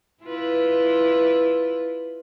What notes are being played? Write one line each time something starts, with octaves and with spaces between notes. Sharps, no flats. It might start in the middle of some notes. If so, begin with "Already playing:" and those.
E4 F4 B4